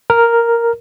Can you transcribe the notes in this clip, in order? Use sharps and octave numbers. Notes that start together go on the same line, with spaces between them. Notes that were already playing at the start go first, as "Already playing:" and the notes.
A#4